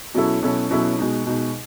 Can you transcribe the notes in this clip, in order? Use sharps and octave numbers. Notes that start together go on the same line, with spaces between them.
B2 F#3 C#4 E4 A4
B2 F#3 C#4 E4 A4
B2 F#3 C#4 E4 A4
B2 G#3 D#4
B2 G#3 D#4